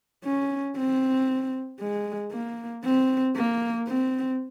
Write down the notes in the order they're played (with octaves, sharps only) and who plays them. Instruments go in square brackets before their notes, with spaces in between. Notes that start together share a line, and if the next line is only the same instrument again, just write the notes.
[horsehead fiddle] C#4
C4
G#3
A#3
C4
A#3
C4